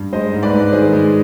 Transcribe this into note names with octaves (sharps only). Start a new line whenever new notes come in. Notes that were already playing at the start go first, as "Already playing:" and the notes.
Already playing: G2
G#3 C5 D#5
G#2
B4 D5
G#2
D#3 G#4 C5
G#3